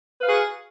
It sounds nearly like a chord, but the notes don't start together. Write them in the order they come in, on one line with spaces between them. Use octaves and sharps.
B4 F5 F#4 G#4